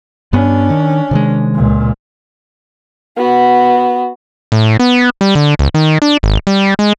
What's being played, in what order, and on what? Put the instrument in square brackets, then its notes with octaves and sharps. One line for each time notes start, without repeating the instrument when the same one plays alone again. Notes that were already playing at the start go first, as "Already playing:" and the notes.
[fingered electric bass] G2 B3 [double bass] C#4 D4
[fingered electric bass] D#3
C3 D#3 G#3
[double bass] C#2 A#2
[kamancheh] B3 F#4
[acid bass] A2
B3
G3
D3
C#2
D#3
D4
G#1
G3
G#3